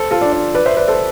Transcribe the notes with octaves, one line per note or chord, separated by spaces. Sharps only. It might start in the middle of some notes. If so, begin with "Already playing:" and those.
Already playing: A4 C5
F4 A4
D4 F4
D4
B4 D5
C5 E5
B4 D5
A4 C5